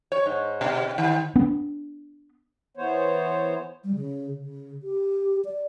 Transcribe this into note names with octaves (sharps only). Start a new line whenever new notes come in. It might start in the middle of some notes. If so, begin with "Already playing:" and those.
C#5
G#2
B2
D#3
B3 D4
E3 B3 C5 C#5
G3
C#3
C#3
G4
D5